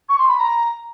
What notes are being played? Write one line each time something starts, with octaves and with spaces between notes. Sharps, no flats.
C#6
C6
B5
A#5